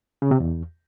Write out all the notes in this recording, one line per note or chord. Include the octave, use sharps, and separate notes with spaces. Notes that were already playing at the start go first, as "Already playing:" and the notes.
C#3
C3
E2